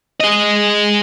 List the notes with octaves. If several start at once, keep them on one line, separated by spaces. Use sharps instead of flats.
G#4 D#5